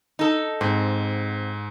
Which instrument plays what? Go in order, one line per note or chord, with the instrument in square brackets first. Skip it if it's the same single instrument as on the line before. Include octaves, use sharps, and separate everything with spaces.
[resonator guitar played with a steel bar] D#4 A4
[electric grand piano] G#2 [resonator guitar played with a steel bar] C4